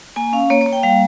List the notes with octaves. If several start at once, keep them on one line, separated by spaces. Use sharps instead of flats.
A#3 G#5
C#4 F5
A#3 C#5
C#5
A#3
G5
G3 F5